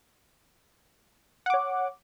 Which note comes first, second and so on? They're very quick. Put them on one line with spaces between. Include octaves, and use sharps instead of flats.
F#5 D6 C#5